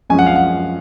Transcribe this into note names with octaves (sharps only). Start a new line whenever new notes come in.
F#2 F3 G#3 C#4 G#5
F#5
F5
F#5